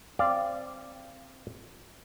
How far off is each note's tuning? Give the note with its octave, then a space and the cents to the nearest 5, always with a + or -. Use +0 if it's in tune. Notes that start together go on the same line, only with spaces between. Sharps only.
C4 +5 D5 +0 F5 -25